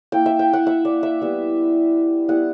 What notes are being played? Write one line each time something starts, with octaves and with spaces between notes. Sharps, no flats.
A#3 E4 G5
E5
G5
F#5
E5
D5
E5
G3 B3 E4
G3 B3 E4 F#5